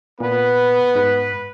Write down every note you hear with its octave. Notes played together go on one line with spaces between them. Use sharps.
A#2 B3 B4
G#2 B4